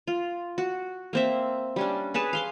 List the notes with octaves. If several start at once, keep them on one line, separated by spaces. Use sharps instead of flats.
F4
F#4
A#3 C4 E5
G3 C#4 D4
G#4 B4 C#5 A5
F5 C6 D6